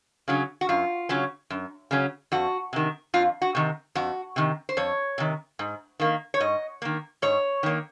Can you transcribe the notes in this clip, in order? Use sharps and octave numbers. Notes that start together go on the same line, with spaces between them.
C#3 F#3 C#4
F#4
F#2 F4
C#3 F#3 C#4
F#2
C#3 F#3 C#4
F2 F#4
C3 D#3
F2 F4
F#4
C3 D#3
F2 F#4
C3 D#3
C5
F2 C#5
C3 D#3
G#2
D#3 A#3
C#5
G#2 D#5
D#3 A#3
G#2 C#5
D#3 A#3